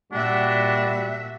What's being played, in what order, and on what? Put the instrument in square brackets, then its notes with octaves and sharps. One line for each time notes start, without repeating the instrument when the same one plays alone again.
[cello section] A#2 E5 [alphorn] G3 [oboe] D4 [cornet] F#4